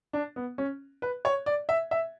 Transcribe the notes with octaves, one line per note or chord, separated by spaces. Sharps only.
D4
B3
C#4
B4
C#5
D5
E5
E5